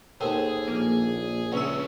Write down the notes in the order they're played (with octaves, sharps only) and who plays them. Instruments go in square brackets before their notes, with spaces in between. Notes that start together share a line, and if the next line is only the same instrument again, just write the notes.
[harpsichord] D#2 A2 [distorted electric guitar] G#4 [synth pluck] C5
[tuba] A#1 [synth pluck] A#3
[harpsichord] C#2 E5 [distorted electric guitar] C#4 D4